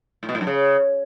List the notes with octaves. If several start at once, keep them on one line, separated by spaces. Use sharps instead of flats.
A2
B2
A2
F#2
C#3